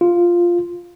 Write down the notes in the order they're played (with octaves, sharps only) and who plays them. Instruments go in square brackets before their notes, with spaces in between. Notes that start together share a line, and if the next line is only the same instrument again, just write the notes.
[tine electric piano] F4